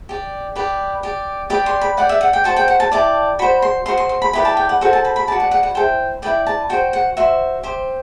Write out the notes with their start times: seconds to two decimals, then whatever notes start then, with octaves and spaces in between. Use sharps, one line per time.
0.09 G4 D5
0.56 G4 B4 D5
1.03 G4 D5
1.50 G4 B4 D5 D6
1.66 C6
1.81 B5
1.97 G4 D5 F#5
2.09 E5
2.21 F#5
2.33 G5
2.44 F#4 C5 A5
2.56 G5
2.68 F#5
2.80 A5
2.92 E4 G4 D5 A5
3.39 F#4 C5 B5
3.62 C6
3.86 F#4 C5 C6
3.97 C6
4.09 C6
4.22 B5
4.33 E4 G4 B4 D5 B5
4.45 A5
4.57 G5
4.69 F#5
4.81 F#4 A4 C5 F#5
4.93 A5
5.05 B5
5.16 B5
5.27 F#4 B4 D5 A5
5.40 F#5
5.51 F#5
5.63 F#5
5.75 E4 A4 C5 G5
6.22 E4 B4 D5 G5
6.47 A5
6.70 F#4 C5 G5
6.93 F#5
7.17 F#4 C5 E5
7.63 G4 C5